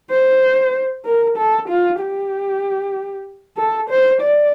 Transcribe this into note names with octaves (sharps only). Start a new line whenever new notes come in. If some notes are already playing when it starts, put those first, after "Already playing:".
C5
A#4
A4
F4
G4
A4
C5
D5